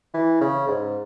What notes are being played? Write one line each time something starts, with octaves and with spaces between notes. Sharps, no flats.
E3
C#3
G#2